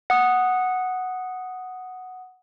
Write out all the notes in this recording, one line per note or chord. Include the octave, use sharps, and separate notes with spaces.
F#5 D#6